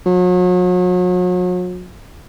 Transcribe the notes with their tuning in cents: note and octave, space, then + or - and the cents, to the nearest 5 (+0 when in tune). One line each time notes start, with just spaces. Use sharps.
F#3 -40